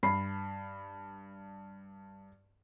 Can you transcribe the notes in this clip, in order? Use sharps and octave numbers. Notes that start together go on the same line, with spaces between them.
G2 B5 C7